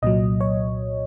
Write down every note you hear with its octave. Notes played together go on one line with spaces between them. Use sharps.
C2 A#2 F#3 D#5
C#5